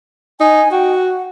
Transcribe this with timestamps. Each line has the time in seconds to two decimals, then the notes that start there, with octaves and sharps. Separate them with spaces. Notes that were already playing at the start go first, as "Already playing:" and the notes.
0.40 D#4 G#5
0.72 F#4 G5
0.94 F#5